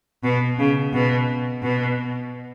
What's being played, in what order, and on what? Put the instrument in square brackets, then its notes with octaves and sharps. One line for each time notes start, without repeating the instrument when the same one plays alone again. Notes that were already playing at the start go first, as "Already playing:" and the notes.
[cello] B2
C#3
B2
B2